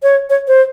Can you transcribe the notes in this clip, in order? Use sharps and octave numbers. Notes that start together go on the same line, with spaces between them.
C#5
C#5
C5